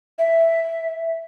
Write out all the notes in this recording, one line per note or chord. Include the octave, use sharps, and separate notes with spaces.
E5